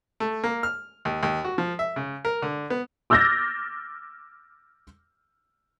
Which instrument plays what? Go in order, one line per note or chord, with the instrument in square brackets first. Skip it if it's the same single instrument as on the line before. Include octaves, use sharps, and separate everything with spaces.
[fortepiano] A3
A#3
F6
D#2
D#2
F#4
F3
E5
C#3
A#4
D3
B3
[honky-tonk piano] D6 E6 F6 G6 A6 A#6